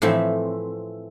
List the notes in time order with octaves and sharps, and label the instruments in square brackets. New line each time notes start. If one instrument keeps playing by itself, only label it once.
[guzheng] A2 E3 F3 C4 E5